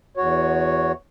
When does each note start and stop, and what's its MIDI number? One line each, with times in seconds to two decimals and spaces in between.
0.17 0.92 40
0.17 0.92 66
0.17 0.92 73